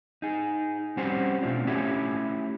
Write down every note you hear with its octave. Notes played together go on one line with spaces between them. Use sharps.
D#4 G#4
G3 C4 C#4 F#4 G4 C5
B2 A3 C4 D4 F4 D5
A3 C#4 E4 F4 G4 C#5